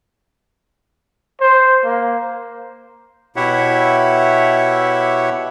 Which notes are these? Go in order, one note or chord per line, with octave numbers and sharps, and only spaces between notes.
C5
A#3
B2 E4 G4 C#5 E5 F#5